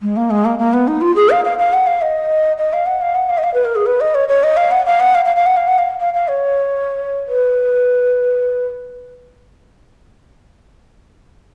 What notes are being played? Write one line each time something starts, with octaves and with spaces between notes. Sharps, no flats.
G#3
A#3
G#3
A#3
A#3
B3
D#4
F4
G#4
F5
F5
F5
F#5
F5
D#5
D#5
F5
F#5
F5
F#5
F5
D#5
F5
B4
A#4
G#4
B4
D#5
C#5
C#5
D#5
F5
F#5
F5
F#5
F5
F5
F5
F#5
F5
F#5
F5
F5
F5
C#5
B4